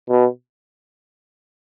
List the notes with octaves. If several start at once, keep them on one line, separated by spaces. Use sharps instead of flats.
B2